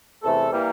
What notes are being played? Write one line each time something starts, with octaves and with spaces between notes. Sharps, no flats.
E2 C3 E3 A3 A4
E3 G3 A#3